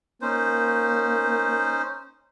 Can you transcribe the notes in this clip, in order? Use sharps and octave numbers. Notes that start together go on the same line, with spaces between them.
A#3 C#4 D#4 C5